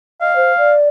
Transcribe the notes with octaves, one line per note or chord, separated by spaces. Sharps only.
D#5 F5
C5
D5